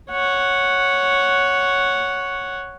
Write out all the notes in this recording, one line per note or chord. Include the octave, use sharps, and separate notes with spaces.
C#5 F#5